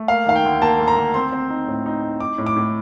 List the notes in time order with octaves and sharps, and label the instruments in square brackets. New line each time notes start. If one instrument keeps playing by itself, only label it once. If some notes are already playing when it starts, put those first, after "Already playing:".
Already playing: [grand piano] A3
A#3 F5
D#3 F5
G5
D2
A#3 A5
D2
A#5
D2
C4 C6
C4
D#4
A2
D#4
D#4
D#4 D6
A2
D6
A2